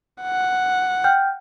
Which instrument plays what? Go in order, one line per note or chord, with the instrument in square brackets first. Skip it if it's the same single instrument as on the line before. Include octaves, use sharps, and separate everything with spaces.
[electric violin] F#5
[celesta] G5 F6 G6